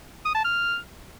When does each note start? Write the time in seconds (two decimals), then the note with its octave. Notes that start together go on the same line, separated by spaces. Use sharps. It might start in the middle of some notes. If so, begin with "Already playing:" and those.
0.25 D#6
0.35 A5
0.44 F6